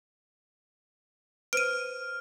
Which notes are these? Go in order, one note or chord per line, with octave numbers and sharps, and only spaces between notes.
B4 C5 F6 D7 D#7